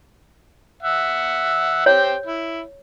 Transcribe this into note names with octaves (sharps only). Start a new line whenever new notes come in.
E5 F#5
G4 C5 C#5 G5
E4